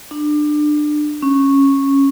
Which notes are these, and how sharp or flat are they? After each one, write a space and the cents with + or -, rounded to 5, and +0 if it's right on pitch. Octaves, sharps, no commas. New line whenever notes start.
D4 +25
C#4 -10